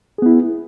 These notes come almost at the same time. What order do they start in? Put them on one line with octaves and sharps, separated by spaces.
G#4 B3 E4